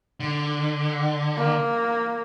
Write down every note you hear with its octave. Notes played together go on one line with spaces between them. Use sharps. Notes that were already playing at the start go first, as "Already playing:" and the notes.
D3
A#3